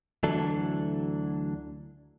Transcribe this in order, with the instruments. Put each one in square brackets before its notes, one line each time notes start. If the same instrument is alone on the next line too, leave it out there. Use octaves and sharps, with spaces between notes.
[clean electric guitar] D2 D3 E3 F#3 D4 A4